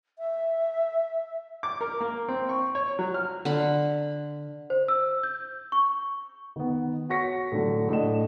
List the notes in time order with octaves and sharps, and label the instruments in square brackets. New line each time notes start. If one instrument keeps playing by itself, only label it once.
[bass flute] E5
[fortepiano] D6
A#4
A#3
C4
C#6
C#5
F#3
F6
[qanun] D3 B5
[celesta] C5
E6
G6
C#6
[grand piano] D#3 B3
F#4 C#5 C#6 A#6 B6 C#7
A2 D3 F#3
A2 D4 D#5 E7